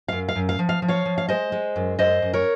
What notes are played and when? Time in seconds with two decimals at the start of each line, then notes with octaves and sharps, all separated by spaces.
0.08 F#2 F5
0.29 F5
0.35 F#2
0.49 F5
0.59 F3
0.69 F5
0.82 F3
0.88 C#5 F5
1.06 F3
1.18 F5
1.28 G#3 C5 D#5
1.52 G#3
1.76 F#2
1.99 F#2 C5 D#5
2.22 F#2
2.33 A#4 C#5